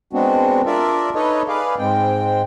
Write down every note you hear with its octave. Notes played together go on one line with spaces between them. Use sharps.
G#3 B3 C4 D4 F#4
D4 F4 A#4 D5 E5
D#4 A4 B4 C#5 D#5
G#4 B4 D5 F5
G#2 G#3 C4 G5